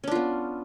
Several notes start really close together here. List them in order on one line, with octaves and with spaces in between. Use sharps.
C#4 D4 F4 B3